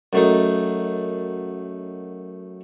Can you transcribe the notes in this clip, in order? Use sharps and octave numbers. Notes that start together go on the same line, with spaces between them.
F#2 A3 D#4